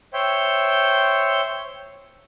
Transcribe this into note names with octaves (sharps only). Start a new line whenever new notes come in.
C5 C#5 E5 G5